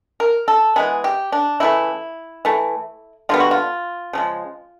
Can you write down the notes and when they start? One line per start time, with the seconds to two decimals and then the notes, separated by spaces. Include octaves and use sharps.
0.20 A#4
0.48 A4
0.76 E3 G#3 B3 G#4
1.04 G4
1.32 D4
1.60 C#3 E3 A3 E4
2.45 E3 A3
3.29 D3 G3 B3 F4
3.40 F#4
3.51 F4
4.13 C#3 F3 G#3